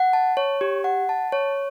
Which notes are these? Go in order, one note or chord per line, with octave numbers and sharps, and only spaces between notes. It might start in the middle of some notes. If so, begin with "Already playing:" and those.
Already playing: F#5
A5
C#5
G4
F#5
A5
C#5